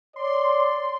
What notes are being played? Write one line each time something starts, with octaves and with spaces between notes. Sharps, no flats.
C#5 D5 C6